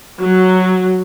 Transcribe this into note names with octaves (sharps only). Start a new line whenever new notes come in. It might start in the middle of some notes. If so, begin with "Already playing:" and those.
F#3